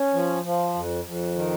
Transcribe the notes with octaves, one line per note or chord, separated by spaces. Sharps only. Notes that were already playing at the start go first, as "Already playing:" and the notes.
Already playing: C#4
F3
F3
F2
F2
D#3